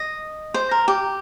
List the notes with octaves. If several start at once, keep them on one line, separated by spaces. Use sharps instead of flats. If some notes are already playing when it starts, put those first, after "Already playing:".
Already playing: D#5
C5
A#4
G4